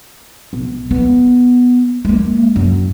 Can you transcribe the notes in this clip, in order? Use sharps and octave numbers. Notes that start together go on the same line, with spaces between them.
B1
B3
G#3 A#3
F#2